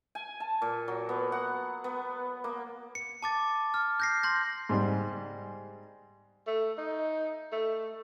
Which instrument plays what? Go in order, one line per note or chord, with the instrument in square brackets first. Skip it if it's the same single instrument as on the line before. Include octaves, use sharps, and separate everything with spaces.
[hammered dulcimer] G#5
A5
A#2
F#3
B3
F#5
B3
A#3
[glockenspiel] C#7
A5 D6 A6
F6
G6 A#6 C7
C6 G6 A#6
[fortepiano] G#2 G3
[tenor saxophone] A3
D#4
A3